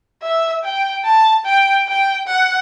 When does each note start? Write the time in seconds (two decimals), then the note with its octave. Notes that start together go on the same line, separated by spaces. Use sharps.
0.22 E5
0.63 G5
1.04 A5
1.45 G5
1.87 G5
2.28 F#5